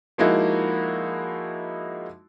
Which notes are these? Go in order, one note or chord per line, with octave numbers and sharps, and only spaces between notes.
F3 G#3 A#3 D#4 E4 F#4